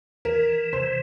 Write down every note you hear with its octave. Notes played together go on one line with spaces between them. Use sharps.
E3 A#4
C3 C5